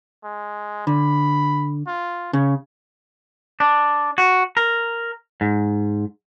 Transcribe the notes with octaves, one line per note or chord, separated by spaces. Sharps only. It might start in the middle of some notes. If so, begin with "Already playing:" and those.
G#3
D3 B5
F4
C#3 C#5
D4
F#4
A#4
G#2